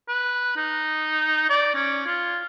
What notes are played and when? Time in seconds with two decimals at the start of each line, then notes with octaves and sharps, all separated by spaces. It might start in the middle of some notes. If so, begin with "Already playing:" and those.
0.08 B4
0.57 D#4
1.50 D5
1.75 C#4
2.06 F4